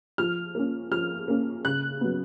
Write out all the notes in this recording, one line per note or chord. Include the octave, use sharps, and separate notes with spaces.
F3 F6
A#3 C#4
F3 F6
A#3 C#4
C#3 F#6
F#3 B3